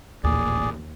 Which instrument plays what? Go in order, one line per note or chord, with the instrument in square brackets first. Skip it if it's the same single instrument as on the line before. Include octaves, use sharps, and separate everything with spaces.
[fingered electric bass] D1 A1 A#2 [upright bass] D#2 [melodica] G#4 D5